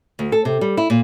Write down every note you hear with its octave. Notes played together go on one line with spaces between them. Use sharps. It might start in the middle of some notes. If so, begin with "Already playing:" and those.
D2
A4
C3
G3
E4
A#2